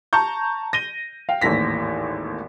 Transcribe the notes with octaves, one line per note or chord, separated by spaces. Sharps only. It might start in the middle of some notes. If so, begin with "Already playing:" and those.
A5 A#5 C#6 G6
A#6 D#7 G7
F5 G5
G#1 D#2 A2 E3 A#6 B6